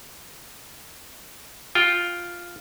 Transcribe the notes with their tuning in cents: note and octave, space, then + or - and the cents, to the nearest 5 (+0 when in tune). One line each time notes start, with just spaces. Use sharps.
F4 +0 G5 +0